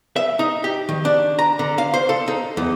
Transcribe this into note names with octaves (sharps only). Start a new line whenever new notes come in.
E5
D#4
G4
D#3
D4
A#5
D3
F5
C5
A4
D#4
E2